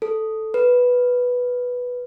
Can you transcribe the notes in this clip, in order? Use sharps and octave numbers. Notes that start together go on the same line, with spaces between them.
A4
B4